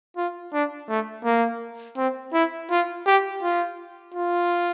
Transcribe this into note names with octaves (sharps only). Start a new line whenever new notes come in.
F4
D4
A3
A#3
C4
E4
F4
G4
F4
F4